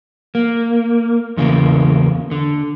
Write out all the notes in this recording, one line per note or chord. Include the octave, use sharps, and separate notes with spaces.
A#3
E2 C#3 A#3
D3